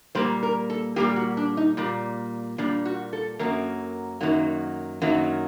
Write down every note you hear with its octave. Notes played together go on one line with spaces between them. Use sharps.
A#2 G3 A#3 C5
A#4
A4
A#2 G3 A#3 G4
F#4
D4
D#4
A#2 G3 A#3
A#2 G3 A#3 D4
F#4
A4
F#2 D#3 F#3 A#3 A#4
F#2 D#3 F#3 A#3
F#2 D#3 F#3 A#3